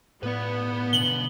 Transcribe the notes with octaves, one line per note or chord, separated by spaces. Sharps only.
A2 B3 B4 D5
B2 D3 F#7 G7